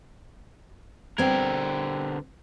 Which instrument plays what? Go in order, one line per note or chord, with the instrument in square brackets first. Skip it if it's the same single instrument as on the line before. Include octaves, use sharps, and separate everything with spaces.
[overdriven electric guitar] D3 A#4 [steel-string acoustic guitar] G3 B3 C4 [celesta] G5 G#6